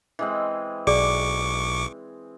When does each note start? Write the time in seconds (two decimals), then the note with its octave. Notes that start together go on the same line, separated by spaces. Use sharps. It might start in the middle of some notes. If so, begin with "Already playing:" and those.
0.19 E3 G#3 C4
0.87 B1 G#4 D5 C#6 D6